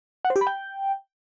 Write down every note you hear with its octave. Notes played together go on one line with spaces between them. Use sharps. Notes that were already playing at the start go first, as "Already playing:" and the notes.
F#5
C5
G4
B5
G5